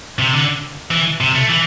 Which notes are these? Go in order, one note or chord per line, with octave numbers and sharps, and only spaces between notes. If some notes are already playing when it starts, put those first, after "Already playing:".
C3
D3
E3
C3
A3
E3